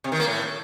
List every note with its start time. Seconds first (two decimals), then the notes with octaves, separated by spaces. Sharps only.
0.04 C3
0.12 D#3
0.20 A#3
0.27 A2